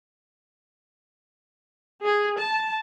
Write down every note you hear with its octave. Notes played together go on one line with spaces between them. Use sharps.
G#4
A5